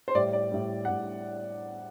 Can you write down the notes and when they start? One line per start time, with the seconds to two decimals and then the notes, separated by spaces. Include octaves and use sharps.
0.08 C5
0.15 A2 G3 D5
0.33 D5
0.52 A2 G3
0.85 A2 G3 F#5